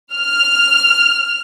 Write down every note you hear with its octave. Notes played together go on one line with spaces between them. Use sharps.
F6